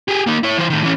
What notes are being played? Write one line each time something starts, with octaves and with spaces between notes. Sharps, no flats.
G4 G#4
A#3 D#4
E4 C#5
E3 C5
A2 D#3
E3 C#4